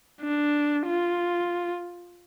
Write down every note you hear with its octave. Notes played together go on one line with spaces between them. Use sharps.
D4
F4